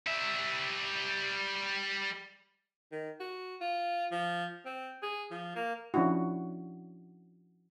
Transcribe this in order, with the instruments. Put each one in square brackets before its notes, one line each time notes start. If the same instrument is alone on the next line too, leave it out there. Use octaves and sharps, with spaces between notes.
[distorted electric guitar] G3 E5
[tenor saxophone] D#3
F#4
F4
F3
C4
G#4
F3
A#3
[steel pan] F3 C#4 D4 E4 F#4